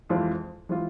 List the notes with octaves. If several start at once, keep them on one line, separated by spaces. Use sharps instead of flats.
F2 E3 G#3 C4 F4
E3 G#3 C4 F4